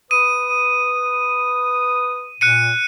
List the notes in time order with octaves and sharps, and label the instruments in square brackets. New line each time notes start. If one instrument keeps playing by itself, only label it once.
[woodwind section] B4 D#6 [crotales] D#7
[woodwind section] A#2 [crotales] F#6 C#7 D#7